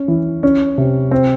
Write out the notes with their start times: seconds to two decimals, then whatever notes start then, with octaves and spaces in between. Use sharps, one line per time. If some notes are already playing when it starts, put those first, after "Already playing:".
Already playing: C#4
0.08 E3
0.43 C#4
0.78 C3
1.11 C4